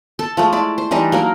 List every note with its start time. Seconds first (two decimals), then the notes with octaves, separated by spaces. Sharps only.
0.19 A4 A5
0.37 F3 G#3 A3
0.53 E4 D5
0.78 C5
0.91 E3 G3 D4 D#4
1.12 F#3 A#3 A#4